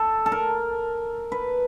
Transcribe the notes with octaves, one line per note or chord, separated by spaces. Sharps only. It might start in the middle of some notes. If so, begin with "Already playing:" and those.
Already playing: A4
A4
A#4
B4